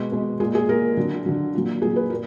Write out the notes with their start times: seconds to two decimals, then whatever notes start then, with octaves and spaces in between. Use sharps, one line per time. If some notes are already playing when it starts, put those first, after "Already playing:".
Already playing: B2 G#3
0.12 B2 G#3
0.40 A#2 G#3 G#4
0.55 G#4
0.69 A#2 G#3 A#4
0.97 D3 F#3
1.26 D3 F#3
1.54 A#2 F#3
1.82 A#2 G#4
1.84 F#3
1.96 B4
2.10 A#2 A#4